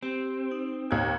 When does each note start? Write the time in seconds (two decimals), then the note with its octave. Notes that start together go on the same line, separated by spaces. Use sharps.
0.03 C4 G4
0.52 D#4
0.91 D#2 G#6